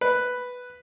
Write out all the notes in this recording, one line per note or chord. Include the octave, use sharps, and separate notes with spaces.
B4